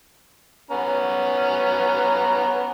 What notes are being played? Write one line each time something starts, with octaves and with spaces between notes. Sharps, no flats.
B3 C#4 A#5